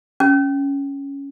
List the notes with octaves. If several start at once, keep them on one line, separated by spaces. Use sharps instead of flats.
C#4